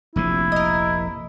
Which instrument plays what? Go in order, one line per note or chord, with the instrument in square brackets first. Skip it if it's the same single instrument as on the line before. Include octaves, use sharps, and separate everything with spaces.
[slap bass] F1 A#1 C3 [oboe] E4
[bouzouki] A#4 D#5